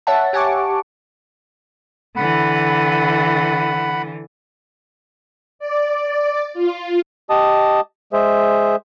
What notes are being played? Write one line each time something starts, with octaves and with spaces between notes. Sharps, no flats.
C#5 E5 F#5 A5
G4 F#5 G#5 A5 C#6 D6
D3 E3 F#5 B5
D5
F4
G4 D#5 A5 D#6
G#3 G#4 C5 E5